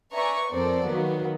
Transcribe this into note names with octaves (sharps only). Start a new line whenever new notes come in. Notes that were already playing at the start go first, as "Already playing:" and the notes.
B4 D5 E5 G#5 A#5 C#6
F2 C4 A4 A#4 C5 D5
D#3 F#3 A#3 B3